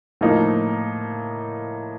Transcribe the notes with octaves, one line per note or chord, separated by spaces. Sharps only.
A2 F3 A#3 D#4